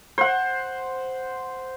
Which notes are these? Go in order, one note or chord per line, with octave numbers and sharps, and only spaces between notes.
C5 F#5